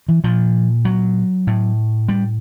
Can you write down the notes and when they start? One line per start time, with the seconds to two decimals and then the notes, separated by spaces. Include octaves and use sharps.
0.08 E3
0.24 A#2 F3
0.85 F#3
1.47 A2
2.09 G3